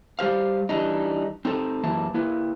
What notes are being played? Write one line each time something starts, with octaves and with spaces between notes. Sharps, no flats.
G3 G4 C5 F5
E3 G3 D4 D#4
C4 D#4 A4
F#2 E3 A#3 E5 A5
A#3 E4 B4